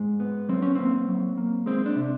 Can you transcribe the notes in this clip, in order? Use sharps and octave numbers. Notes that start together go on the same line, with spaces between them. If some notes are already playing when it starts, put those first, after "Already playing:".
Already playing: G#2 G#3
B3
F#3 C4
C#4
A#3 C4
F#3
A#3
G#3 C4
D4
C3